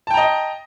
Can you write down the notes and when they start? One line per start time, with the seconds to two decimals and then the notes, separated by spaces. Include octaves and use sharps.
0.07 A5
0.10 G5
0.14 A#5
0.17 D#5